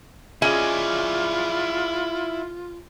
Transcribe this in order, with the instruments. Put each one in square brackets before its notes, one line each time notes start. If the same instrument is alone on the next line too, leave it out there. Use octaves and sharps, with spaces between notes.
[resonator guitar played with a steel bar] C#4 G#4 D#5 [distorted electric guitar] E4 D5 [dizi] F4